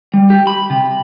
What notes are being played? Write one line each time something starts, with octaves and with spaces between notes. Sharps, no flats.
G3
G4
B5
C3